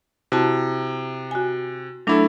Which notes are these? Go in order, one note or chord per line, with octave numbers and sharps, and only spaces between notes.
C3 E4 F#4 A5
F#4 G#5
F#3 A3 D4 E4 A4